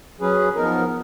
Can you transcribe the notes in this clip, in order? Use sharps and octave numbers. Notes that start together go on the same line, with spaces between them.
F#3 C#4 G#4 B4
F3 B3 D#4 A#4